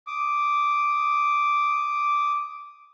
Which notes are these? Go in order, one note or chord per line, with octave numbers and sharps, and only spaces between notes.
D6 D#6